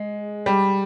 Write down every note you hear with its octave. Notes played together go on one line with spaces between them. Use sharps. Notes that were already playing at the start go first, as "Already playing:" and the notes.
Already playing: G#3
G3